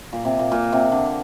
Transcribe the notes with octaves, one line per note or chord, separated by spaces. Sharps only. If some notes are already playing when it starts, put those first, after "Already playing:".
A#2
C3
A#2
A#2
C3
D3